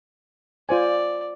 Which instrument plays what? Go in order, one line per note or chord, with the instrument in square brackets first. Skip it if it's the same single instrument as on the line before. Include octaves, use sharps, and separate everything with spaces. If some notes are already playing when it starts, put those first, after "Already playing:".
[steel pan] F4 C5 G#5 [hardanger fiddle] D5